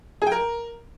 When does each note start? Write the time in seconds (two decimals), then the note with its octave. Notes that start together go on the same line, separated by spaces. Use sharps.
0.22 G#4
0.27 G5
0.32 A#4